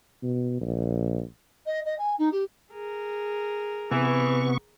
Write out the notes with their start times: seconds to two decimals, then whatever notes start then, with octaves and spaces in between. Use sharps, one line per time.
0.23 B2
0.61 A#1
1.65 D#5
1.85 D#5
1.98 G#5
2.18 D#4
2.31 G4
2.72 G#4 A#4
3.91 C3 E3 B3 C#6